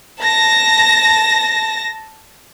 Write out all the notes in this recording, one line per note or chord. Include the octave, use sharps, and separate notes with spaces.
A5 A#6